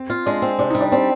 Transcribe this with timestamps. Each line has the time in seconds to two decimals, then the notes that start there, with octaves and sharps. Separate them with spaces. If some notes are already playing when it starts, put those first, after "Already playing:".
Already playing: C4
0.10 F4
0.26 G#3 D4
0.42 C4
0.59 C3 D4
0.70 G3 D#4
0.80 D4
0.92 C4 D4